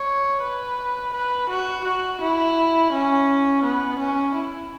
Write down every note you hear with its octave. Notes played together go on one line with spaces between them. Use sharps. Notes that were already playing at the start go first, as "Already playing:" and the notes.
Already playing: C#5
B4
B4
F#4
F#4
E4
C#4
B3
C#4
E4